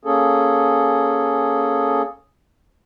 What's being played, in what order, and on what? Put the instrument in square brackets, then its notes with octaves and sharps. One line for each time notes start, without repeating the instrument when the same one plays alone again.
[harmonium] A#3 C#4 G#4 A4